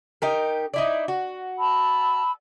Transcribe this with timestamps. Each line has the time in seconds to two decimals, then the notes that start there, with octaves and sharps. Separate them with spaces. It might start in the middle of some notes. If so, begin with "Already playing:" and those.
0.22 D#4 G4 A#4
0.74 D#4 E4 D5
1.08 F#4
1.59 A5 B5 E6